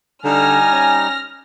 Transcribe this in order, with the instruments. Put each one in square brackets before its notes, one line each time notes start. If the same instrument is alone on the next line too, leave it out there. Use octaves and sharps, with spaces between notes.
[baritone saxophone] D3 [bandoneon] G3 D#4 [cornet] G#5 [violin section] F6 A#6
[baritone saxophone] C#4